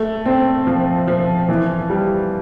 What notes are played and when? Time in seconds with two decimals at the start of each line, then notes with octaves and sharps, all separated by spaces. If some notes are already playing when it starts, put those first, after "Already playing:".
Already playing: A3
0.26 C4
0.67 F3
1.07 F3
1.48 E3
1.90 G3